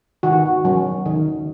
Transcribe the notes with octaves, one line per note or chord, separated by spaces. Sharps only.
D#3 F#4
F#3 C#4
D#3